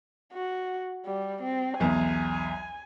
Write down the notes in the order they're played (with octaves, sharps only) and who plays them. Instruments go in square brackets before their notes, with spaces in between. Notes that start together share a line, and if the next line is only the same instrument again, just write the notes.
[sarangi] F#4
G3
C4
[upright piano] B1 E2 [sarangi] G#5